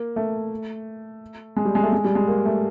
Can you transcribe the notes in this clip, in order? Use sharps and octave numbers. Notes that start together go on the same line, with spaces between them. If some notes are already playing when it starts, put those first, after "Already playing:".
Already playing: A#3
A3
G#3
G3
G#3
A3
G#3
G3
G#3
A#3
A3